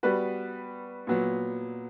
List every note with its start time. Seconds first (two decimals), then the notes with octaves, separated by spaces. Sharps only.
0.03 G3 B3 F#4 B4
1.07 A#2 F#3 B3